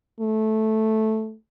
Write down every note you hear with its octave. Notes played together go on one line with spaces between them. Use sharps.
A3